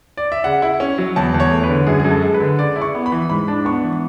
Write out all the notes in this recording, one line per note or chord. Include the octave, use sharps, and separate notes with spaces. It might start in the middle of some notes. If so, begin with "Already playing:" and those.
D5
E5
C#3 F#5
E4
C#4
F#3
E2 A5
E2
C#5
A3
B4
D3
F#2 G#4
F#2 G#4
A4
G#3
B4
D3
C#3 D5
E4
C#6
B3
B5
E3
G#2 B5
D4
B3 C#6
E3